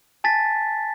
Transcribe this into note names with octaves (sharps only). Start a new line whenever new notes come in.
G#5 A5 A6 B6